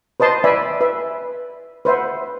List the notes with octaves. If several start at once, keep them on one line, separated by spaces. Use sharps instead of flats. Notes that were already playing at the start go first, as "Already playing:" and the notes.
B4 C5 D#5 A5 C6
B4 D5 E5 G#5 B5
B4 E5
B4 C5 E5 F#5